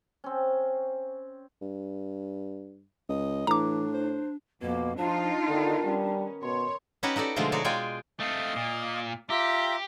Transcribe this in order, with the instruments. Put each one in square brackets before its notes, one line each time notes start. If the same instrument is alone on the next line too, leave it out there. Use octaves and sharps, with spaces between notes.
[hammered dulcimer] C4 C#4
[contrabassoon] G2
[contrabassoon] C#2 [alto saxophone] D#5
[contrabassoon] A2 [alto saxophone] E3 [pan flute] D4 [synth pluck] A#5 D6
[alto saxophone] C5
[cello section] F2 [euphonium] B2 [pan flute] A#3
[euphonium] F3 [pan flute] D4 [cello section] D#4 F4
[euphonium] D3 [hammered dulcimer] D#3 B3
[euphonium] G3 [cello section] C#4
[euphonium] B2 [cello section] C#5 [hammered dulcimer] C6
[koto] C#4 D#4 F#4 G4 B4 F#5
D#4 F#4 A4 D5
B2 D3 F3 G#3 A3 F4
D#4 F#4 G#4 C#5 D5
G#3 F4 D5 G5 G#5
[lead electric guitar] A3 C4 [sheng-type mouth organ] D#5 F5
[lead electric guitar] A#2
[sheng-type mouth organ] F4 E5 A#5 [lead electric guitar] G4